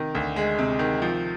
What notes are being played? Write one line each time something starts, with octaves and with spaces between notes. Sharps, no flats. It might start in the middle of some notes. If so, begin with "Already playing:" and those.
Already playing: C3 D#3
D2
G#3
C3
D#3
F3